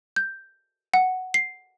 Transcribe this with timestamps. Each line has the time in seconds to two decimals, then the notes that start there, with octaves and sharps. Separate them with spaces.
0.16 G6
0.94 F#5
1.34 C7